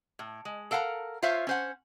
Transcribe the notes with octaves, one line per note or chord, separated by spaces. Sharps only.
A2
G#3
A4 A#4 F5 F#5 A#5
F4 C5 C#5 E5 F5
C#4 C5 F#5